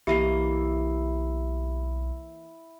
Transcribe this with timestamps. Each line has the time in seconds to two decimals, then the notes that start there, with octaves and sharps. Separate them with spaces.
0.07 B1 E3 A#3 E4 G4 D#5 E5 C7